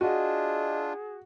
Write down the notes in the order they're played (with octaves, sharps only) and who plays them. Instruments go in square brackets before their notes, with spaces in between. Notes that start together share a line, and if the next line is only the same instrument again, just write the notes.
[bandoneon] D4 F4 [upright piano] F#4 [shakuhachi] G#4 [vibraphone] D#5